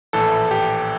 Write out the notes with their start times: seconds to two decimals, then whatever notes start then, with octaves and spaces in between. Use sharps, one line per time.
0.13 A#1 A2 E3 A4
0.51 G4